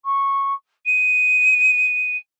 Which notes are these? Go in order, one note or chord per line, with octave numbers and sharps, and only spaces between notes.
C#6
D#7